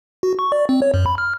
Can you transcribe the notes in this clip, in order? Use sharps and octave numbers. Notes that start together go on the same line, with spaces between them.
F#4
C#6
D5
C4
C#5
F#2
B5
F6